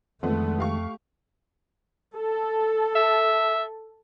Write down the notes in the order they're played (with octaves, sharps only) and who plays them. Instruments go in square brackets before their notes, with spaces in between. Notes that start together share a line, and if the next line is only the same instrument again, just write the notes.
[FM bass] F2 [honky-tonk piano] D3 B3 [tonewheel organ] D#3 G#3 [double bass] A3
[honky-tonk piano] G4 F5 C#6
[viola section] A4
[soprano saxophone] E5